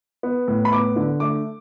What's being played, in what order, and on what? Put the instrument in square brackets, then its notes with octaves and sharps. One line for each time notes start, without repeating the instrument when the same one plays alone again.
[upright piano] B3
A2
B5
B3 D6
D3
A3 D6